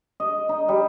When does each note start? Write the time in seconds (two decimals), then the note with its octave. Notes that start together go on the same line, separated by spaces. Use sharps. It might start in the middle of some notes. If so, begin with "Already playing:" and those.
0.20 D#5
0.49 D#4
0.69 G3